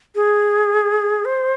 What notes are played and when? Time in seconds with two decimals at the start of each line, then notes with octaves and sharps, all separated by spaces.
0.15 G#4
1.25 C5